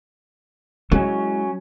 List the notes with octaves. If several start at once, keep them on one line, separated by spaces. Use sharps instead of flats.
F#3 G#3 C#4 E4